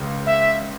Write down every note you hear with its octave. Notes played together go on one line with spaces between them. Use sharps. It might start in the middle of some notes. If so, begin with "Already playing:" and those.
Already playing: C#2 C#3
E5